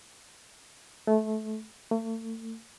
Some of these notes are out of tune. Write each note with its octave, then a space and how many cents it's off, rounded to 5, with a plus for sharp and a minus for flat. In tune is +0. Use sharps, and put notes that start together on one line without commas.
A3 -20
A3 +40